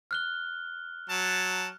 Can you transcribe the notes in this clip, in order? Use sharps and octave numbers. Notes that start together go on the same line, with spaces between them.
F6 F#6 G7
F#3 A5